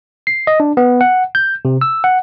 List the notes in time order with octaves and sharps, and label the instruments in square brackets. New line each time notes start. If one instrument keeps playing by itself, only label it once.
[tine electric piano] C7
D#5
D4
B3
F#5
G6
C3
E6
F#5